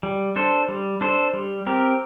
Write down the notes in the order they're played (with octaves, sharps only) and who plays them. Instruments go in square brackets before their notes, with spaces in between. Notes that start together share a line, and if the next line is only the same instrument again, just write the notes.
[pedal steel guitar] G3
D4 A4 C5
G3
D4 A4 C5
G3
C4 G4 A#4